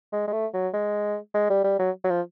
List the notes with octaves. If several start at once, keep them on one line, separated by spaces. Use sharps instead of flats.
G#3
G#3
A3
F#3
G#3
G#3
G3
G3
F#3
F#3
F3